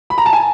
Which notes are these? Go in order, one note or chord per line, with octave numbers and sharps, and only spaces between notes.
B5
A#5
A5
G#5